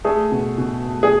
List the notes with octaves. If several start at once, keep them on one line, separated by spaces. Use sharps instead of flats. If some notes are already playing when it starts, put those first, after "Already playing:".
A3 G#4
B2
B2
A3
G#4